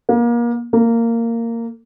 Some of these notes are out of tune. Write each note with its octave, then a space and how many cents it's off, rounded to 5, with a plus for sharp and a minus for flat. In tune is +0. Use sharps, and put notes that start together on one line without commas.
A#3 +30
A#3 -15